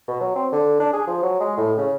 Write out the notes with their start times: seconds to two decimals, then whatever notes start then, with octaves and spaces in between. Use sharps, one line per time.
0.08 B2
0.21 F#3
0.35 C4
0.52 D3
0.80 D4
0.93 G#4
1.08 F3
1.23 F#3
1.40 G#3
1.57 A2
1.77 C#3